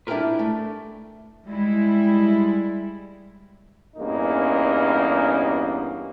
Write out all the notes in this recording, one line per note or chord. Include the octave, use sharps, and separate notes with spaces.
D4 E4 F4 G4 A#4 B4
A3
G3 G#3 E4
E2 G2 A#3 C#4 D#4